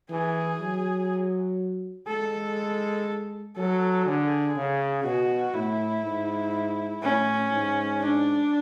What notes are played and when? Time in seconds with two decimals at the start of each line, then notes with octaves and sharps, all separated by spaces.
0.10 E3 G#4
0.60 F#3
2.08 G#3 A4
3.57 F#3 A4
4.06 D3 G#4
4.56 C#3
5.05 B2 F#4
5.54 A2 E4
6.04 G#2
7.03 A2 C#4
7.52 G#2
8.01 D4